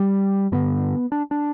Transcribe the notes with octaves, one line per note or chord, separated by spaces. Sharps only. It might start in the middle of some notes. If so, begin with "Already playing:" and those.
Already playing: G3
G2 D3 B3
D4
D4